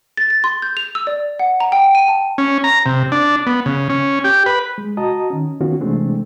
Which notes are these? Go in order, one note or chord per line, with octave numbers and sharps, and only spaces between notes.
A6
A6
C6
G6
F7
E6
D5
F#5
A#5
G5
D#7
A5
C#4
A#5
C3
D4
B3
C#3
C#4
G4
B4
G#3
F#4 D#5 A5 A#5 D#6
D#3 C#4
D#3 B3 C#4 F4 F#4
C3 E3 G#3 A3 C4 D4